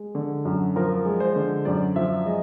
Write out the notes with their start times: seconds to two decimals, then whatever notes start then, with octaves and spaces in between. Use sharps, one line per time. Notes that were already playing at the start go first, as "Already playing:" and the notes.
Already playing: G#3
0.15 D3
0.45 F#2
0.76 F3 A#4
1.05 G#3
1.20 C5
1.36 D3
1.65 F#2 D5
1.96 F3 E5
2.26 G#3 D#5